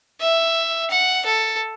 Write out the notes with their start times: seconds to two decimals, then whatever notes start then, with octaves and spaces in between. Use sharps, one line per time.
0.21 E5
0.90 F#5
1.26 A4